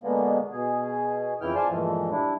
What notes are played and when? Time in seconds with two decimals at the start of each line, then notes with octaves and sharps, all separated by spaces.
0.04 B2 D3 G#3 A#3 B3
0.52 B2 G#4
1.41 F2 C#3 E3 E4 G5 F6
1.55 C5 D5 F5 G#5 A5 C6
1.69 G2 A#2 E3 F3 G#3 A3
2.11 G3 D4 E4